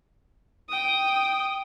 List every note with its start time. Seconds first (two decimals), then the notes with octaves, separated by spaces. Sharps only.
0.69 G5 D#6